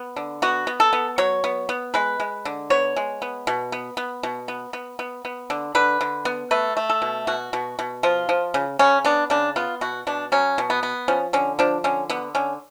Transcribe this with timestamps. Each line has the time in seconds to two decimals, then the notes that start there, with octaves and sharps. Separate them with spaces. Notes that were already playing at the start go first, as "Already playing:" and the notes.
Already playing: B3
0.16 D3
0.42 B3 F#4
0.67 B3
0.80 A4
0.93 B3
1.18 F#3 C#5
1.44 B3
1.69 B3
1.94 G#3 B4
2.20 G#3
2.45 D3
2.70 B3 C#5
2.96 G#3
3.22 B3
3.47 B2
3.72 B3
3.97 B3
4.23 B2
4.48 B3
4.73 B3
4.99 B3
5.25 B3
5.50 D3
5.75 D3 B4
6.01 D3
6.25 B3
6.51 A3 B4
6.77 A3
6.90 A4
7.02 B2
7.27 B2 F#4
7.53 B2
7.79 B2
8.03 F3 F4
8.29 F3
8.54 C#3
8.79 C#3 C#4
9.05 B3 D4
9.30 C#3 D4
9.56 B3 F4
9.81 B2 F#4
10.07 B2 D4
10.32 F#3 C#4
10.58 B2
10.70 B3
10.83 B3
11.08 F3 C#4
11.33 D3 C#4
11.59 F3 D4
11.84 D3 C#4
12.10 D3 B3
12.35 D3 C#4